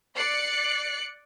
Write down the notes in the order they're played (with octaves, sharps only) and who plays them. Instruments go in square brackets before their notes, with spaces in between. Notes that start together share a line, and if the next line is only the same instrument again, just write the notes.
[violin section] D5 F#6 C7 C#7